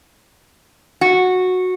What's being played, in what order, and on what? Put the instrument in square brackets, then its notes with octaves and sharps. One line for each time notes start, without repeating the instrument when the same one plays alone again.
[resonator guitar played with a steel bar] F#4